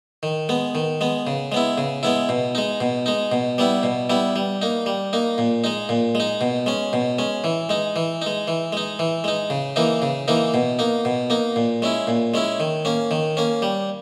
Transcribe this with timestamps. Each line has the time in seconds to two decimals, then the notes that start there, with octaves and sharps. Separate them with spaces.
0.23 D#3
0.49 G#3 B3
0.75 D#3
1.01 G#3 B3
1.27 C#3
1.52 G#3 B3 E4
1.78 C#3
2.03 G#3 B3 E4
2.29 B2
2.55 G#3 D#4
2.81 B2
3.06 G#3 D#4
3.32 B2
3.58 G3 B3 E4
3.83 B2
4.10 G3 B3 E4
4.36 G3
4.62 A#3 D#4
4.86 G3
5.13 A#3 D#4
5.38 A#2
5.64 G#3 D#4
5.89 A#2
6.15 G#3 D#4
6.41 B2
6.66 G#3 C#4
6.93 B2
7.19 G#3 C#4
7.44 E3
7.69 G#3 D#4
7.96 E3
8.22 G#3 D#4
8.48 E3
8.72 G#3 D#4
8.99 E3
9.24 G#3 D#4
9.50 C#3
9.76 E3 A#3 D#4
10.02 C#3
10.28 E3 A#3 D#4
10.54 B2
10.79 A#3 D#4
11.05 B2
11.30 A#3 D#4
11.56 A#2
11.82 G#3 C#4 E4
12.07 A#2
12.34 G#3 C#4 E4
12.60 D#3
12.85 A#3 C#4
13.11 D#3
13.37 A#3 C#4
13.62 G3